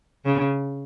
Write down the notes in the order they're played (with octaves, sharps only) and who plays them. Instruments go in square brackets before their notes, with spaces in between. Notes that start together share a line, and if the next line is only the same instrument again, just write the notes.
[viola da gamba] C#3